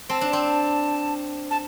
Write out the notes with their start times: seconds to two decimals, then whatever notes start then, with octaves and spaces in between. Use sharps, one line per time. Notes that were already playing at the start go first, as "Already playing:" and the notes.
0.09 C4 A5
0.21 D4
0.33 C4
1.51 A5